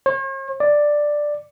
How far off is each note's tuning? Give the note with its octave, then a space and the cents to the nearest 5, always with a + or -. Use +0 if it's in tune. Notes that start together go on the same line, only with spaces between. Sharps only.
C#5 -45
D5 +5